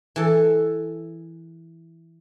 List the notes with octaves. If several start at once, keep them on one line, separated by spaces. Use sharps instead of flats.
E3 A4